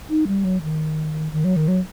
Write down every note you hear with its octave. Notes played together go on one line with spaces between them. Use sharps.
D#4
G3
F#3
D#3
D#3
F#3
D#3
F#3